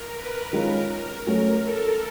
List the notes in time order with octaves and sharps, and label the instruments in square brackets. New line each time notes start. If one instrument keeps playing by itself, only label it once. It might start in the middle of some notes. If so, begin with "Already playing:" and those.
Already playing: [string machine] A#4
B4
[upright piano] D#3 G#3 C#4 F4 [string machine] A#4
[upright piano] F#3 A3 C#4 F#4
[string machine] A4